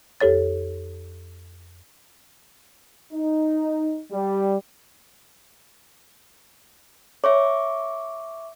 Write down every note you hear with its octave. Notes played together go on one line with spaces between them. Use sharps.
F2 G4 A4 C#5 A6
D#4
G3
C#5 E5 C#6 D6